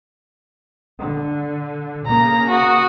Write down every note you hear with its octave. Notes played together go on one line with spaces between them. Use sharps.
D3
C#3 A#3 A#5
F#4 D#6